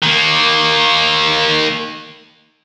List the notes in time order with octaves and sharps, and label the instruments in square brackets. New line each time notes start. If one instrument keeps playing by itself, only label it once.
[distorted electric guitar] D#3 A#3